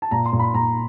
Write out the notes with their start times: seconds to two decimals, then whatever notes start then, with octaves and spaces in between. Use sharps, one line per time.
0.02 A5
0.11 A#2 A#5
0.26 C6
0.33 A#2
0.39 B5
0.54 A#2 A#5